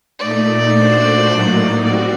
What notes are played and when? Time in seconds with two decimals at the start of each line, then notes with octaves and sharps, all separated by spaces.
0.19 A#2 A3 D#4 D5
0.74 A#2 A3 D4 F#4 C5
1.30 A2 F#3 A#3 D#4
1.85 G3 C4 F#4 D5